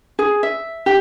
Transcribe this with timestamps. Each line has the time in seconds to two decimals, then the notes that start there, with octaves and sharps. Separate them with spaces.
0.19 G#4
0.43 E5
0.86 G4